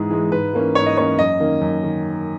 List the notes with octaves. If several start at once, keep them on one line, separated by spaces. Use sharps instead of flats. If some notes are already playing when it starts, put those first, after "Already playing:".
Already playing: G#2 E3 G#3 G#4
E3 G#3
G#2 B4
E3 A#3 C#4
G#2 C#5
D#5
E3 A#3 C#4 C#5
F#2 D#5
D#3 A#3 C#4
F#2
D#3